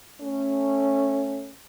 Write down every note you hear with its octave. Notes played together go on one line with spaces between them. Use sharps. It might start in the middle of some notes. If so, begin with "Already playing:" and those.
A3 C#4